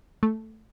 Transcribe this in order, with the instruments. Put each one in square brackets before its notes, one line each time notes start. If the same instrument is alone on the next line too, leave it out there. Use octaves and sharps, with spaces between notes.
[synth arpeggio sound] A3